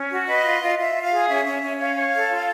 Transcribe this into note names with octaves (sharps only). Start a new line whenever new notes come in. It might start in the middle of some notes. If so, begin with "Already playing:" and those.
Already playing: C#4
F#4
B4 D#5
F4
F4
F4 E5
F4
F5
G#4
C#4 E5
C#4
C#4
C#5 F5
C#5
A4
F4